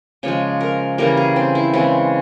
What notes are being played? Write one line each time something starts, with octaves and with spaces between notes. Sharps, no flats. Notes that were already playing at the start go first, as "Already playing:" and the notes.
C#3 F3 G#3 C#5
A#4
C#3 E3 G3 A#3 A#4
G#4
C4
E4
C#3 E3 G#3 C4